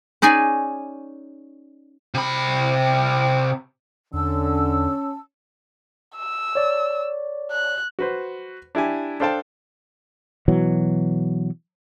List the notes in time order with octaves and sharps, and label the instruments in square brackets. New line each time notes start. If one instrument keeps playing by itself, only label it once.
[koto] C#4 D#4 G#4 D5 G#5
[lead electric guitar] C3 B5
[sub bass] E2 [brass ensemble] D3 [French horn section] C#4 [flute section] A5 E6
[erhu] E6
[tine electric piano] C#5 D5
[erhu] F#6
[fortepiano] F#4 B4 C5
D4 E4 G4 G#5
D4 A4 C5 F5 G5 A5
[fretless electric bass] B2 E3 F#3